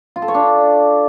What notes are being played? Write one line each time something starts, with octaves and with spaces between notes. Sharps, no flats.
F4
A4
C#5
D4